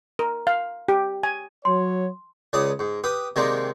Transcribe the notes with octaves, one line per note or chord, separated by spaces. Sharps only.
A#4
F5
G4
G#5
F#3 C#5 C6
C#2 C#3 D5 A5 D#6
G#2
G4 B4 D#6
C3 D#3 G#3 A#3 C4 D4